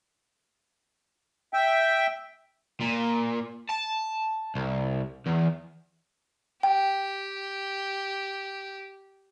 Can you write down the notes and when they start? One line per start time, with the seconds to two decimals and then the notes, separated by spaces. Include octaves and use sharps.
1.53 E5 G5
2.81 A#2
3.69 A5
4.55 C2
5.26 E2
6.63 G4 G5